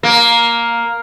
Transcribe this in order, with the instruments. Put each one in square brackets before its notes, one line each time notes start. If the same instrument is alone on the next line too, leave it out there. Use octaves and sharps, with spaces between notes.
[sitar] A#3